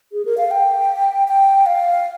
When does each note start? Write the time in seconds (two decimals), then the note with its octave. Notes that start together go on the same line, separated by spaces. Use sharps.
0.12 G#4
0.25 A#4
0.38 F5
0.51 G5
1.28 G5
1.66 F5